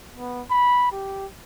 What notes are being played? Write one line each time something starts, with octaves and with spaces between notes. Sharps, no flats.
B3
B5
G4